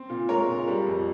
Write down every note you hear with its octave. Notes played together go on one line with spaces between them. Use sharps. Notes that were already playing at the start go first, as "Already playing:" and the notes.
Already playing: C4
A#2
G#3 A#4 C#5
A#2
G3
F2